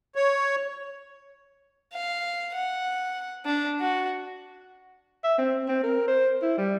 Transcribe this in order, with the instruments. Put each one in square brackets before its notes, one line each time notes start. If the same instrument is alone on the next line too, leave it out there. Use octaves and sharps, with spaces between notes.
[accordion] C#5
[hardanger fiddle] F5
F#5
D4
F#4
[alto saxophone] E5
C4
C4
A#4
C5
E4
G3